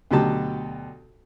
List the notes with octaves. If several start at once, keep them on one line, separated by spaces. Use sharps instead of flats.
D2 B2 F#3 G4 A5